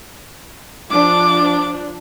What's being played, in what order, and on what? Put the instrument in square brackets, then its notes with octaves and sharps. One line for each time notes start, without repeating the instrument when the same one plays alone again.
[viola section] F3 D4 [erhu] D6